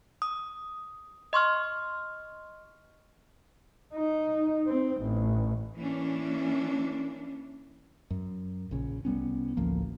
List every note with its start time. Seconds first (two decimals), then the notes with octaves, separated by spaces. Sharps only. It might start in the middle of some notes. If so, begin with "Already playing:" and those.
0.22 D#6
1.33 D#5 C6 C#6 F6
3.94 D#4
4.67 C4
5.02 A1
5.76 E3 A#3 C#4 D4
8.11 F#2
8.71 A#1 C#3
9.05 C2 G3 B3 C#4
9.57 A1 D2 F3 A#3